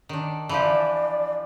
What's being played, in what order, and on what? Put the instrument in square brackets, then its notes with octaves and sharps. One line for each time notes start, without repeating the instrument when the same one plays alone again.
[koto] D#3 D4
[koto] E3 F3 G4 [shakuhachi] D5